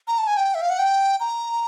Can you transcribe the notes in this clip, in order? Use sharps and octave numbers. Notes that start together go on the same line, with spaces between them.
A#5
A5
G#5
G5
E5
F5
F#5
G5
A#5